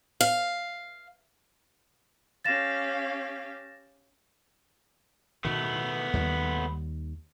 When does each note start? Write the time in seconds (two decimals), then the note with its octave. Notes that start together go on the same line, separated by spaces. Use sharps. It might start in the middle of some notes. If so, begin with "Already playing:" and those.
0.21 F5
2.45 C#4 G4 F5 A6 A#6 E7
5.45 B2 D#3 A3 B3
6.13 D#2 D#3 G3